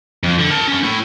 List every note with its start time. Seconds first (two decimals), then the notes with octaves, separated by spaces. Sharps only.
0.23 F2
0.39 D3
0.51 A#4 A5
0.68 C#4 F#4
0.84 A2 E4